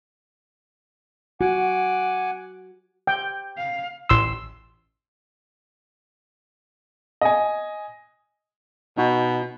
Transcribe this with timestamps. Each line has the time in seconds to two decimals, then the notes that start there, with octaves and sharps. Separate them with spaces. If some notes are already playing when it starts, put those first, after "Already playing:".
1.41 F#4 F#5 G#5 D6
3.07 G5
3.57 F5
4.09 A1 C6 E6
7.21 D#5 G#5
8.97 B2 D#4 F#4